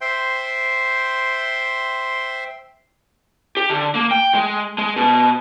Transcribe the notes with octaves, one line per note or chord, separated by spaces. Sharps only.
C5 E5 G5 C6
G4
D3
A#3
G5
G#3
G#3
B2